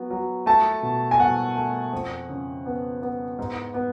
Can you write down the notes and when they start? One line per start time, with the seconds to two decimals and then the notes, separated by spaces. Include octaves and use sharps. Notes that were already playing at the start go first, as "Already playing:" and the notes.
Already playing: F#3 B3
0.10 F#3
0.46 A3 A5
0.83 B2
1.11 G#5
1.19 B2 F#5
1.55 A3
1.93 F2
2.29 C#3
2.66 B3
3.02 B3
3.38 G#2
3.74 B3